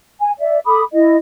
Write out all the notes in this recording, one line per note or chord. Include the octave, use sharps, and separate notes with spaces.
G#5
D5 E5
A4 B5 D6 D#6
E4 D#5